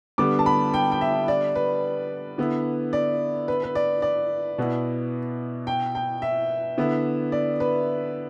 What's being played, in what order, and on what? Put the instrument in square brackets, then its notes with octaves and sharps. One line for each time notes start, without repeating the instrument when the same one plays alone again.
[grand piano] D3 G3 B3 [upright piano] D6
[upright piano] A5
B5
G5
G5
E5
D5
B4
[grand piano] D3 B3 E4
[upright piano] D5
B4
B4
D5
D5
[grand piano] B2 B3 E4
[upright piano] G5
G5
E5
[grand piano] D3 B3 E4
[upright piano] D5
B4